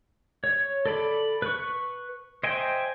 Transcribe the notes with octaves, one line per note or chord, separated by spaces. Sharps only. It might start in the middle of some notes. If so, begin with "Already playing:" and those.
C#5
A4 D5 B5
B4 C#6
C5 D#5 E5 G5 G#5